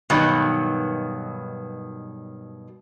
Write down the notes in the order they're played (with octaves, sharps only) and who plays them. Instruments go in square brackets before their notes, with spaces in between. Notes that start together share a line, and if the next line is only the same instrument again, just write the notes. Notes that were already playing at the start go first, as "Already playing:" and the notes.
[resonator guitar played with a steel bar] G2 B2 D#3 F#3